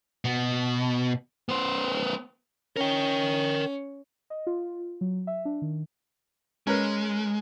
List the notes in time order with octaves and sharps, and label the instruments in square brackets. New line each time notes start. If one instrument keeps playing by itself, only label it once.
[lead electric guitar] B2
B3 C5
[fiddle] C#4 [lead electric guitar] A#4 G5
[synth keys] D#5
F4
F#3
E5
D4
D#3
[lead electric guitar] G#3 [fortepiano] C#4 A#4 B4